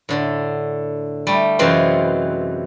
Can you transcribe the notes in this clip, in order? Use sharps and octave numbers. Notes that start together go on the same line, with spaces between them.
A2 D3
G3 A3
F#2 C3 E3 G#3 C4 F4